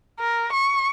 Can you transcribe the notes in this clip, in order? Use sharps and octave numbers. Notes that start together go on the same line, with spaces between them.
A#4
C#6